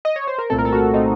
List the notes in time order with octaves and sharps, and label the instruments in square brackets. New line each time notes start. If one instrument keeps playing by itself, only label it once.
[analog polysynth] D#5
C#5
C5
A#4
C2 A#2 A3 C4 A4
A#4
A4
F#4
A#2 A3 C4 D#4